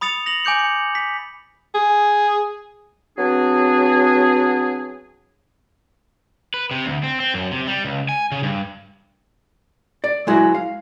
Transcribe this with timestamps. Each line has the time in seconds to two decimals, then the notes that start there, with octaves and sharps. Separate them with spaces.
0.01 B5 D#6 A6 C#7 F7
0.26 A#6 F7 F#7
0.45 G#5 D6 G6 C#7
0.59 C#7
0.95 B6
1.74 G#4
3.18 F#3 B3 C4 D4 G#4
6.54 B4
6.71 C3
6.86 D2
7.04 C4
7.20 C4
7.34 F#2
7.51 C3
7.67 G3
7.85 C#2
8.09 G#5
8.32 C#3
8.43 G2
10.04 D5
10.27 F#3 G#3 E4 F#4 A#4
10.55 F5